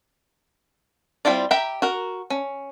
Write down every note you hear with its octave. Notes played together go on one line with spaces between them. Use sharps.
G3 C4 E4 F4 D5
G4 E5 G5 A#5 B5
F#4 A#4
C#4